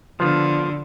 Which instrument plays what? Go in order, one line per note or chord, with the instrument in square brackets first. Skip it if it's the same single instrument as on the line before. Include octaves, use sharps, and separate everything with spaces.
[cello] D3 [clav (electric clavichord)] F3 B3 F4